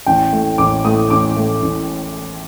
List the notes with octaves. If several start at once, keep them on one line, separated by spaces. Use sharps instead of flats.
A1 G5
A2
A1 D6
A2 D#6
A1 D6
A2
A1